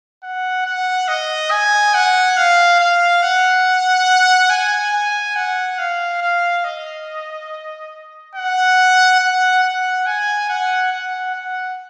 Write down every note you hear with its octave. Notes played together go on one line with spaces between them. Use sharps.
F#5
F#5
D#5
G#5
F#5
F5
F5
F#5
G#5
G#5
F#5
F5
F5
D#5
F#5
F#5
F#5
G#5
F#5
F#5
F#5